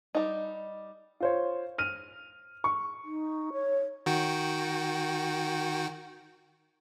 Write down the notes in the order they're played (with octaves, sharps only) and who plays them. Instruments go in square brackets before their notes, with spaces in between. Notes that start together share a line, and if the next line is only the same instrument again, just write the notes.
[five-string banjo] G3 D#4
[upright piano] F4 C5 C#5
F6 D#7
C#6
[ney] D#4
C#5
[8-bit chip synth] D#3 F#4 G5